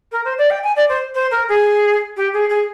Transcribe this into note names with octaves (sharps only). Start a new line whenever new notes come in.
A#4
C5
D5
G5
G#5
D5
C5
C5
A#4
G#4
G4
G#4
G#4